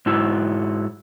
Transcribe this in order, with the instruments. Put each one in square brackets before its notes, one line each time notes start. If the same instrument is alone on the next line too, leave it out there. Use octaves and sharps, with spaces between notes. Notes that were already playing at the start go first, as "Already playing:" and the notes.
[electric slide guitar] G#2 E4 F#4